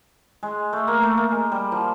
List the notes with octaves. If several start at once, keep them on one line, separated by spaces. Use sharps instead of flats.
G#3
A3
A#3
A3
A#3
G#3
G3
F3